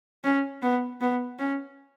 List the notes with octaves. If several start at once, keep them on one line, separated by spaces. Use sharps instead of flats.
C#4
B3
B3
C#4